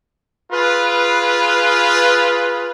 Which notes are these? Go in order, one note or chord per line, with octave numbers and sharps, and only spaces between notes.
F4 G#4 B4